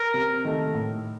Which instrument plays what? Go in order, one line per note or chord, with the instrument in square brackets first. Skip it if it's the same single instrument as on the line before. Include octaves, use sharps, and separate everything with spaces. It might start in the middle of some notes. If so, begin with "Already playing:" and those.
Already playing: [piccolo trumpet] A#4
[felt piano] C3
D#3 A3
A2